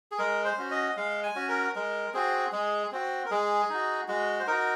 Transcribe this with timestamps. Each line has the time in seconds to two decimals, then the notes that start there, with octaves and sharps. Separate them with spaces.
0.12 G#4
0.18 G#3 A#4
0.45 C5
0.57 C#4 F#4
0.71 D#5
0.97 G#3 F5
1.23 G#5
1.36 C#4 F#4
1.49 A#4
1.75 G#3 A#4
2.14 C4 F#4 G#4
2.52 G#3 G#4
2.92 C4 F#4
3.25 A#4
3.31 G#3 G#4
3.70 D#4 F#4
4.08 G#3 F#4
4.39 C5
4.47 D#4 F#4 A#4